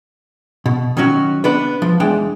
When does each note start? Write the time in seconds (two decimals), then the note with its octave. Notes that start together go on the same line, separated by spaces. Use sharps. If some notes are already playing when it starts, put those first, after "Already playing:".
0.66 B2
0.97 D#3 F#3 C#4 F#4
1.44 B3 D4 B4
1.82 F3
2.00 E2 G#3 D4 G5